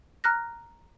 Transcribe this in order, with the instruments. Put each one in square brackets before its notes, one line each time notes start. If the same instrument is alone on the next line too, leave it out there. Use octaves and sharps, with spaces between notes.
[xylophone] A#5 F6 F#6 A#6